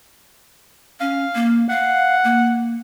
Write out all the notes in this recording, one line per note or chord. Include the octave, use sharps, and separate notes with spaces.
C#4 F5
A#3
F5 F#5
A#3